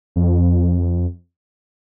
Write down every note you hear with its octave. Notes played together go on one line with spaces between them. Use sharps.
F2